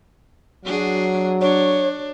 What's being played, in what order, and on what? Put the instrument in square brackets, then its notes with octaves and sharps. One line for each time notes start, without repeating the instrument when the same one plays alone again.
[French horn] F#3 [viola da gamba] D4 F#4 G#4
[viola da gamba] D4 [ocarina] C#5